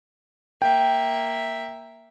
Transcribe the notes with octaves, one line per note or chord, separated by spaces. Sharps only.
A#3 E5 G5